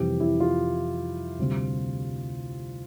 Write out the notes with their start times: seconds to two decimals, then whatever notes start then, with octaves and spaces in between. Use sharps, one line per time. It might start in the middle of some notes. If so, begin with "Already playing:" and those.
Already playing: F2 C3 E3 G3 G4
0.20 E4
0.40 F4
1.39 D2 C3 G3